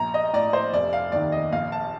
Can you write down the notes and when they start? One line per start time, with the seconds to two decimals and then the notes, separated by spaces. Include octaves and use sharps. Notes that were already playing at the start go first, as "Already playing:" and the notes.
Already playing: A#1 A#5
0.14 D#5
0.33 A2 D5
0.53 C5
0.73 F1 D5
0.93 F5
1.12 D#2 D#3 D5
1.32 D#5
1.52 A#1 F5
1.72 A5